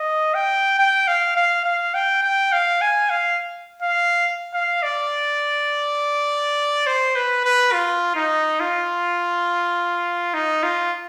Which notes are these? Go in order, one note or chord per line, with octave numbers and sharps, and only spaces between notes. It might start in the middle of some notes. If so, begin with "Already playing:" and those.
Already playing: D#5
G5
G5
F5
F5
F5
G5
G5
F5
G#5
F5
F5
F5
D5
C5
B4
B4
F4
D#4
F4
D#4
F4